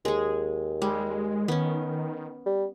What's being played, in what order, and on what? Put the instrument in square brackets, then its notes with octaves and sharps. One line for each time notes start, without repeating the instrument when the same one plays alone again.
[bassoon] D#2 [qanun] G#3 G#4
[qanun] G3 [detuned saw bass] G#3
[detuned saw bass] D#3 [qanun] B3 C#4
[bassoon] G3